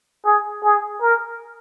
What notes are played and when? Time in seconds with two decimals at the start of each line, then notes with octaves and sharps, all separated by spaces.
0.26 G#4
0.64 G#4
1.01 A#4